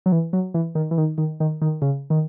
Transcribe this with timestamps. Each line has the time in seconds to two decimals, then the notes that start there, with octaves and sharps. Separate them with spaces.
0.06 F#3
0.12 E3
0.33 F#3
0.54 E3
0.75 D#3
0.91 E3
0.98 D#3
1.18 D#3
1.40 D#3
1.62 D#3
1.82 C#3
2.10 D#3